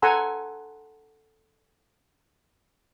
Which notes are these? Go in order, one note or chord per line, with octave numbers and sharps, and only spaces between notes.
A4 F#5 G#5 A#5 C6 E6